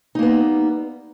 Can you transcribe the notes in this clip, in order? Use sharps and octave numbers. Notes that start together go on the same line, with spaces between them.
G3 A#3 B3 D#4